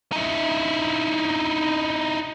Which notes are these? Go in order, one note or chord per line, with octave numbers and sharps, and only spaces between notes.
D#4 E4